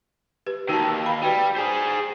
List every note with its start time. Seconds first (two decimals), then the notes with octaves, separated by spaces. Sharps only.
0.46 G4 B4
0.69 D#2 D#3 F#4 A5
1.04 F5 B5
1.22 G3 F#4 B4
1.56 G#4 C5